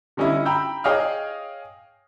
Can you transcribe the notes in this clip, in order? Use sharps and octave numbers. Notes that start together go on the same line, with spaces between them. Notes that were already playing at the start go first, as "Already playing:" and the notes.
D3 G3 C#4 D#4 E4
G5 A#5 B5 E6 G6
G#4 C#5 D#5 F5 G5 F6